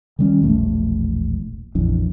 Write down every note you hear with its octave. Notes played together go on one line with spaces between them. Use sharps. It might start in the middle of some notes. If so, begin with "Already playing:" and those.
D#3 G3 C#4
E1 A#1 A3
A#1 F2 E3 D4